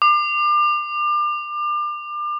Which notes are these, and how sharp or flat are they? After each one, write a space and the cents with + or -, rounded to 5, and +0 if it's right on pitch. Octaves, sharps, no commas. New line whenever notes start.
D6 +35